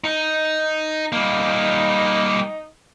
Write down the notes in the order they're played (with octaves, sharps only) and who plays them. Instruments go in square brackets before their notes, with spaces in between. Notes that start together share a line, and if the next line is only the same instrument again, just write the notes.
[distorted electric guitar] D#4
[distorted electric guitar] G3 A#3 [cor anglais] D#4